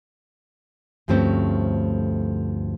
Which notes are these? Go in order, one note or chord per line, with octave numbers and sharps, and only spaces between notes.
D2 G2 F3 A3 C4 C#4